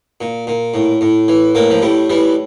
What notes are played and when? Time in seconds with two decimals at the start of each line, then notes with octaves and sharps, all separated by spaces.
0.21 A#2
0.47 A#2
0.74 A2
1.01 A2
1.28 E3
1.55 A2 A#3
1.70 F3
1.82 A2 G3
2.10 E3 G3